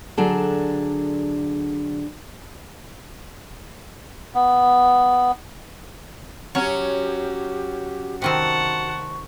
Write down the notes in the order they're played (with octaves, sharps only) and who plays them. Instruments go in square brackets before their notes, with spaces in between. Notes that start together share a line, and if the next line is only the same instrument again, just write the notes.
[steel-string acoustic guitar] D3 F#3 D4 G#4 A4
[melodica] B3
[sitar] F#3 C#4 [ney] G4 [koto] C#5
[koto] C3 D#3 C4 [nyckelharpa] F#5 A5 [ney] C#6